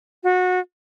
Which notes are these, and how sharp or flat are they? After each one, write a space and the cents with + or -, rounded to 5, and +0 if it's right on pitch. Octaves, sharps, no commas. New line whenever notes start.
F#4 -25